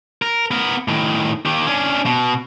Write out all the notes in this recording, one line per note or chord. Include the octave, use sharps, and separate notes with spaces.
A#4
B3 A#4
A2 D#3
D#3 G4
C#4 D4
B2